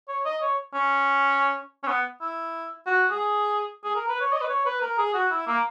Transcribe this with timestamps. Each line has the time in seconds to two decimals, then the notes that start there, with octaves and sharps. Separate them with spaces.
0.08 C#5
0.25 D#5
0.42 C#5
0.74 C#4
1.83 C#4
1.87 B3
2.21 E4
2.86 F#4
3.10 G#4
3.84 G#4
3.96 A#4
4.08 B4
4.21 C#5
4.32 D#5
4.41 B4
4.49 C#5
4.65 B4
4.81 A#4
4.98 G#4
5.14 F#4
5.31 E4
5.47 A#3